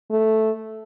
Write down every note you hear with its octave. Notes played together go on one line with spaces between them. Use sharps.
A3